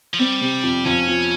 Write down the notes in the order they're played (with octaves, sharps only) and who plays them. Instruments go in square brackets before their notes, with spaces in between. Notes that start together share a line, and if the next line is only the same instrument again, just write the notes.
[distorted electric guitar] F3
[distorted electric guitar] G3 [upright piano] C4
[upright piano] C3
F2
[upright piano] F2 [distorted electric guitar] C#4
[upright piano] F3